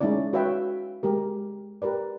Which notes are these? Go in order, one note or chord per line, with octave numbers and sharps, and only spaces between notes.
G#3 C#4 D#4 E4 D5
F#4 B4 C#5 E5 F5 G5
G#3 G4 A#4
G4 A#4 B4 D5